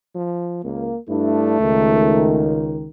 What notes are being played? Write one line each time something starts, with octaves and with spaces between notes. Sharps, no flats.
F3
C#2 A#3
G2 A3 D4 E4
C#2 D#3